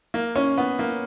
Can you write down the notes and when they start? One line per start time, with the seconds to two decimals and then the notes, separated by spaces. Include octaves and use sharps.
0.14 A#3
0.36 C#4
0.58 B3
0.79 A#3